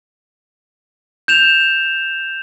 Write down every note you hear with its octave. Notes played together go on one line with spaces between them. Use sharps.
G6 E7 F7